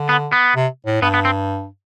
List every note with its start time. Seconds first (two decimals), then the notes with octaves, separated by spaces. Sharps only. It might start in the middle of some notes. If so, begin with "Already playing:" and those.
Already playing: D3
0.09 B3
0.32 B3
0.56 C3
0.86 A2
1.02 G2 B3
1.14 B3
1.25 C4